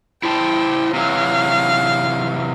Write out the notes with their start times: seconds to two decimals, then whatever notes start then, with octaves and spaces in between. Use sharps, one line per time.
0.23 E4 C5 G5 A5
0.94 C3 E3 F#3 F5